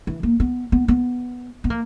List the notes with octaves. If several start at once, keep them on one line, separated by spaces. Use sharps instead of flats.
E3
A#3
B3
B3
B3
B3
A#3